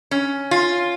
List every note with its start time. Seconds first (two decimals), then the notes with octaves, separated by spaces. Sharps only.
0.11 C#4
0.51 F4